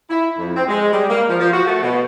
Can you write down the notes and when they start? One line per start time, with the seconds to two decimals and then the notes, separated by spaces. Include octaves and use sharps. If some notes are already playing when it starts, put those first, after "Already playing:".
0.09 E4
0.38 F2
0.56 C4
0.68 G#3
0.92 G3
1.09 A#3
1.27 F3
1.40 F3
1.53 F#4
1.67 A3
1.83 B2